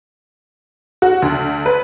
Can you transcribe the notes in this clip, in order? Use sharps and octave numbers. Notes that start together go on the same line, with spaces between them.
F#4
D2
B4